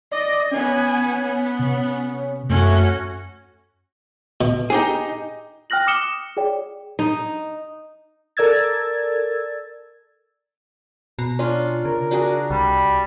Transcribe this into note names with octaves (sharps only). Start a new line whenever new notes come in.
D5 D#5
B3 C#4 G#5
B3
C3
F#2 A3 C#4 F#4
B2
D#4 G4 G#4
G5 F6 F#6 A#6 F#7
D6 D#6 C#7 E7 G7
G#4 C#5 D5 G5
D#4
A4 A#4 D5 E6 G#6 A6
B2 A#5
C#4 D4 F4
C#3 A#4
D4 F#4 G#4
C2 G3